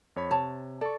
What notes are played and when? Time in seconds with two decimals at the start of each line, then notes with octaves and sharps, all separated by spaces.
0.16 F2 C#5 B5
0.31 C3 C#5 A5
0.81 A4 D5 C#6